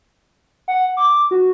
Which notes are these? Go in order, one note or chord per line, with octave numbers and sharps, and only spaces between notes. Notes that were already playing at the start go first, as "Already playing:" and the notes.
F#5
D6
F#4